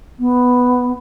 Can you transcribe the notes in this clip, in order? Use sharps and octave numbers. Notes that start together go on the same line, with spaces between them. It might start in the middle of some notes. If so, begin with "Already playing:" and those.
B3